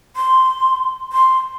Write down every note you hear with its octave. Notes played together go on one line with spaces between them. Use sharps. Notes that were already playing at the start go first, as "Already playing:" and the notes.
C6
C6